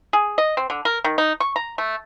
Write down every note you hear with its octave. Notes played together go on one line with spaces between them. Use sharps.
G#4
D#5
C4
D3
A#4
D#3
D#4
C#6
A#5
A3